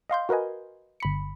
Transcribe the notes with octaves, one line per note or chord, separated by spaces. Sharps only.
D#5 F5 C6 G6
F#4 A#4 B4 D#5 G#5
G1 B5 C#7